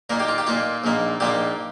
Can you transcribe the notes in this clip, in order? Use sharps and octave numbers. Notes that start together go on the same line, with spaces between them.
A#2 A#3 D#4 A#4
G4
F4
G4
A#2 A#3 D#4 F4
A#1 A#2 A#3 D#4
A#1 A#2 A#3 D#4 G4